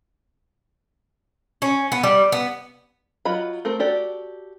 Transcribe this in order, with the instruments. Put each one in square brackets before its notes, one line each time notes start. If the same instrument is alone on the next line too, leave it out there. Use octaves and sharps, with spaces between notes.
[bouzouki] C#4
B3
G3
B3
[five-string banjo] F#3 F4 F#4 D#5 B5
A3 C4 A#4
F#4 G4 A4 D5